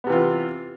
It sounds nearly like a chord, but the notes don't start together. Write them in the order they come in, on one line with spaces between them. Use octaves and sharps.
B3 C3 E3 F4